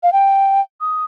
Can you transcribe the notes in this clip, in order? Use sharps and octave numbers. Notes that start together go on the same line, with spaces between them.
F5
G5
D#6